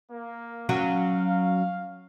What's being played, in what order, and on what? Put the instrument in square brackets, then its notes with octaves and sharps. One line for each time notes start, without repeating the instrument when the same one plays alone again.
[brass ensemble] A#3
[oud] F#3 C#4 F#4 [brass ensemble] F5